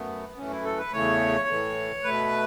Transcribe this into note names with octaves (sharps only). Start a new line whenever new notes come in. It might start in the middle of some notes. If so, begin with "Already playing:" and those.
Already playing: F#2 A3 B3
F#2 E3 A3 C#4
E4
A4
B4
E2 C#3 E3 A3 C#5
A2 E3 A3
B2 A3 B4